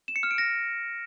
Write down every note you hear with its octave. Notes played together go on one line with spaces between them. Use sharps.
E7
C#7
F6
D7
A#6